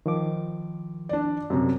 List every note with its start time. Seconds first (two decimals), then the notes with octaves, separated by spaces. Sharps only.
0.06 D#3 F3 D6
1.09 D4 D5
1.50 F#2 C3